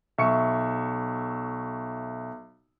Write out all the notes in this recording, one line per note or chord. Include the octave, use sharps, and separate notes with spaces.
B1 E5 C#6 C#7